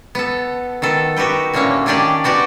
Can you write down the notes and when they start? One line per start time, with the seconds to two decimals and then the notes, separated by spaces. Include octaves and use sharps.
0.15 B3 A4
0.82 D#3 B3 A4
1.16 D#4 F#4 G4 B4 G5
1.54 A2 D3 A#3 C#4 C#5
1.86 D#3 C#4 D4 G4 D5
2.24 B3 F#4 G4 D5